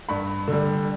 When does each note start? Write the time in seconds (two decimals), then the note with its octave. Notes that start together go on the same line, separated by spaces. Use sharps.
0.09 G2 B5
0.48 D3 G3